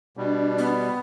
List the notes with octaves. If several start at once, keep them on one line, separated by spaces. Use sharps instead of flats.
B2 G3 D4
B3